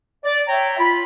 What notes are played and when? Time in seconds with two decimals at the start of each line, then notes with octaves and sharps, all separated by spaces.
0.24 D5
0.48 C#5 E5 G5 A#5
0.78 F4 B5